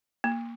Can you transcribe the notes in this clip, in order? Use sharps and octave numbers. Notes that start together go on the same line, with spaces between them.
A#3